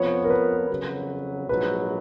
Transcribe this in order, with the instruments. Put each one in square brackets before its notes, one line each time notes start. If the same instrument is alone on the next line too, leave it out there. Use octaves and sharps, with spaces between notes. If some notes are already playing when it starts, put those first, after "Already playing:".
Already playing: [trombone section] F2 F3 B3 [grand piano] C#5
[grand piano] A#4
B4
[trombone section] F2 C#3 F#3
[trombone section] A#1 G#2 F#3 [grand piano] B4